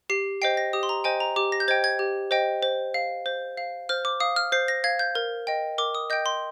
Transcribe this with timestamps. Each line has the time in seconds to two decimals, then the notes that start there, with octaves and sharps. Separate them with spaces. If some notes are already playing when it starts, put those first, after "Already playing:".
0.10 G4 C7
0.42 C5 D#5 G5 C7
0.57 A#6
0.73 G4 D#6
0.83 C6
0.89 A#5
1.04 C5 D#5 G5 G#5
1.20 A#5
1.36 G4 D6
1.52 A#6
1.60 G6
1.68 C5 D#5 G5 G#6
1.84 G#6
1.99 G4
2.31 C5 D#5 G5
2.63 C5
2.94 F5
3.26 C5
3.58 F5
3.89 C5 F6
4.05 D6
4.20 F5 D#6
4.36 F6
4.52 C5 C7
4.68 A#6
4.84 F5 G#6
4.99 G6
5.15 A#4
5.47 D#5 G5
5.78 A#4 D6
5.95 D#6
6.10 D#5 G5 G6
6.26 C6